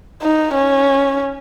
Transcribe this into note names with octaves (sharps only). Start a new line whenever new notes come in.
D#4
C#4